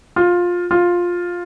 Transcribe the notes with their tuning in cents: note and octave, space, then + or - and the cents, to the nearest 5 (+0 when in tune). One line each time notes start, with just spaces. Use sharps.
F4 +15
F4 +10